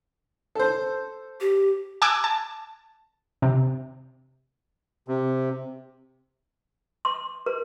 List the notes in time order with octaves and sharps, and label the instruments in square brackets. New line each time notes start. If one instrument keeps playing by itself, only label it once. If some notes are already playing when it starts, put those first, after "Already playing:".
[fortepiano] A4 C5
[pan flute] G4
[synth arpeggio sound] G#5 A5 D6 E6 F#6 G#6
A5
C3
[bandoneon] C3
[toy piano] C6
A#4